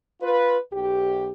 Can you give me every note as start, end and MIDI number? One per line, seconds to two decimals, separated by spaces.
0.22 0.56 65
0.22 0.56 71
0.72 1.31 35
0.72 1.31 67